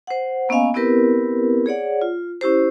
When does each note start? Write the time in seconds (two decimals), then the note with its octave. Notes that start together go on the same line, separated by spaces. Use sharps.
0.07 C5 F#5
0.49 A#3 B3 C#4 D#5 F5 G#5
0.74 B3 C4 E4 G4 A#4 B4
1.66 G#4 C#5 D5 F#5
2.02 F4
2.41 C#4 E4 G4 C5